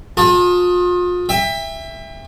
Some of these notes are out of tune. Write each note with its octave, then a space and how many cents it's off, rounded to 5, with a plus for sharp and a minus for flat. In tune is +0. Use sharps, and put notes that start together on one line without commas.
F4 +35 G#4 +0 A5 +20
E5 +5 G5 +40